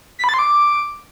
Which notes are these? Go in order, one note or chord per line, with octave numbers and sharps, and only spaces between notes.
B6
B5
A6
C6
D6